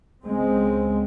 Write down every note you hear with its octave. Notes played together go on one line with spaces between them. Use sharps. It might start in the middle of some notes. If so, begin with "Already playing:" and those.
C#2 C#3 G#3 C4